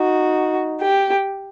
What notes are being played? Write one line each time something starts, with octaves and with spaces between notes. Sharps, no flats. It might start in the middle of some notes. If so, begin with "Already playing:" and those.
Already playing: D#4 F#4
G4